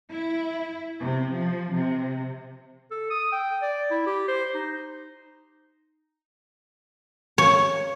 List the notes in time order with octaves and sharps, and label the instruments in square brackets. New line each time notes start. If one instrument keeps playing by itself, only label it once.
[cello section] E4
C3
F3
C3
[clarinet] A4
D#6
G5
D5
E4
G4
C5
D#4
[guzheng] C#5